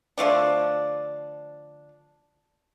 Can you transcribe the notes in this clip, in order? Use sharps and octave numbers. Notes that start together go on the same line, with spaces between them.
D3 F3 A3 D4